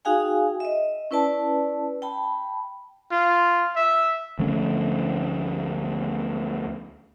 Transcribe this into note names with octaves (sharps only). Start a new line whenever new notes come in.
D#4 F#4 G#4 F5 G5 G#5
D#5 E5
C#4 E4 B4 D5 A5
G5 A5 B5
F4
E5
D2 F3 A3 C#4